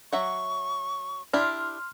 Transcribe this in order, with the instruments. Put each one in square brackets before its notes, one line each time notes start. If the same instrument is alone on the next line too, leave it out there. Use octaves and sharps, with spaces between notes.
[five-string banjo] F#3 E5 F#5 [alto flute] C#6
[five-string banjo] D4 E4 G4 [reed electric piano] C6 F6